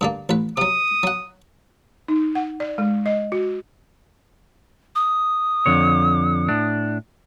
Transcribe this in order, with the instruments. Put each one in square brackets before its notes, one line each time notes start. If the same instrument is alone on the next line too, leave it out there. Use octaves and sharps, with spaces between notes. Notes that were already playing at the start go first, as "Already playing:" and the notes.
[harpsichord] G2 D3 A#3
A1 B4
[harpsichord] C3 F#3 [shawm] D#6
[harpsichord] F#3 F#5
[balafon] D#4
F#5
D5
G#3
D#5
F#4
[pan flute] D#6
[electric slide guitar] F2 D3 C#5
A2 D4